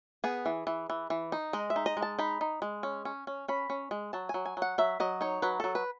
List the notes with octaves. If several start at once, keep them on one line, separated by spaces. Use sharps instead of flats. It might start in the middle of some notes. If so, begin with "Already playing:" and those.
B3 G#4
E3
E3
E3
E3
D#4
G#3 D#5
E5
D#4
D#5
G#3
A5
D#4 B5
D#4
G#3
C#4
C#4
C#4
C#4 B5
C#4
G#3
F#3 A5
F#3 G#5
G#5
F#3
F#5
F#3 E5
F#3 D#5
D#4 C#5
F#3 B4
F#3 A4
B4